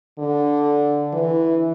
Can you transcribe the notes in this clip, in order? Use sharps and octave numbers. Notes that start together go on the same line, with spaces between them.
D3
E3